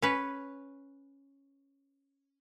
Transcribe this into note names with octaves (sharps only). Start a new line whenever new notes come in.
C#4 B4